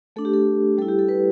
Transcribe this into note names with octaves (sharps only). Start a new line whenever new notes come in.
A3 D4 A4
G4
A4
G3 E4 A4
G4
A4
B4